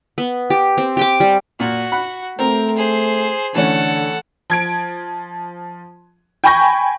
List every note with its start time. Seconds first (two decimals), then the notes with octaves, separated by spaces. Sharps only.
0.18 B3
0.50 G4
0.78 C4
0.97 G4 G5 D6
1.20 G3
1.60 A#2 F#4
1.92 F#5 B5
2.39 A3 C4 A#4
2.77 G#4 C5
3.55 D3 E3 A3 C#4 A4 F#5
4.50 F3 G#6 D7
6.44 G5 G#5 B5 C#6 G6 A#6